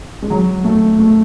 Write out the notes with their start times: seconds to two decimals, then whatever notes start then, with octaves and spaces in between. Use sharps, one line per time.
0.22 G#3
0.30 F#3
0.64 A3
0.99 A3